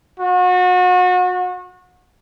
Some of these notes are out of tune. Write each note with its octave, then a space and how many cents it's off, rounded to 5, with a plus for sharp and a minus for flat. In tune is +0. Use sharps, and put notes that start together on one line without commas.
F#4 -30